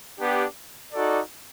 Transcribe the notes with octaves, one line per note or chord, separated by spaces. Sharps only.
B3 D4 G4
D#4 F#4 A4 D5